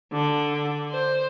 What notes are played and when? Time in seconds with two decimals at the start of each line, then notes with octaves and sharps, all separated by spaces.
0.12 D3
0.91 C5